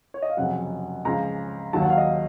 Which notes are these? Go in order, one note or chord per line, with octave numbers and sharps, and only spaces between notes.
C#5
D#5
F5
F1 F2 C#3 F#3 F#5
C#2 C#3 F3 A#5
D#2 D#3 F#3 A5
F#5
F5
D#5